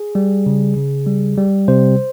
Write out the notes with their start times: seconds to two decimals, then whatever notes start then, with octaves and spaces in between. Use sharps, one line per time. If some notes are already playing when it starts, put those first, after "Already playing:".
Already playing: G#4
0.15 G3
0.46 C#3
0.77 C#3
1.06 G3
1.37 G3
1.68 C3 C5